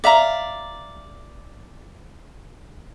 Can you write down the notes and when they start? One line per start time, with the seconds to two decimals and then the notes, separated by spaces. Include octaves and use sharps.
0.04 D5 E5 F5 A#5